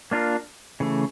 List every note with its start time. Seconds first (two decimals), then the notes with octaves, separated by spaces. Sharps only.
0.11 A#3 D4 F4 A#4
0.80 C#3 E3 A3